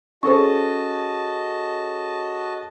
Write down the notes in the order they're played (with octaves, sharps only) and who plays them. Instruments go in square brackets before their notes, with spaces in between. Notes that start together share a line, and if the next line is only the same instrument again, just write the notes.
[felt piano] C#4 G#4 A4 [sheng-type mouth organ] F#4 D#5 A5 [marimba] C5 C#6